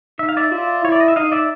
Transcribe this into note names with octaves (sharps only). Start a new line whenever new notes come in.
D#4 E5
F5
D5 E5
F4 D5 E5
E4 C#5
D5
D#5
E5
D#4 D#5 F5
D5 E5